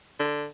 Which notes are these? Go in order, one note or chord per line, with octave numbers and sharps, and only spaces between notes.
D3